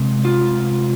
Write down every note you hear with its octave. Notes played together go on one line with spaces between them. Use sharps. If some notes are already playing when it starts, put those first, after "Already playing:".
Already playing: C3 G#3 C4
F4